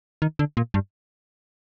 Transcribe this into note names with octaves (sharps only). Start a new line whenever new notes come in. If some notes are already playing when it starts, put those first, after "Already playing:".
D#3
D3
A#2
G2